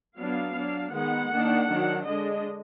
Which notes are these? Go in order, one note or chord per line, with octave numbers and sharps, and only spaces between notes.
F#3 B3 D4 F5
F#3 D4
D#3 G#3 B3 F#5
D#3 A#3 D4
D#3 F#3 D4
D3 G#3 D4 D#5